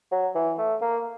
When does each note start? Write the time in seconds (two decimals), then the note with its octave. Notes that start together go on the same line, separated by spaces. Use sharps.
0.11 F#3
0.35 E3
0.58 A3
0.81 A#3